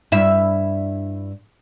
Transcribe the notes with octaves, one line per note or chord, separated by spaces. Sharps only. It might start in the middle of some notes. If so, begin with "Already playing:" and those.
G2 E4 E5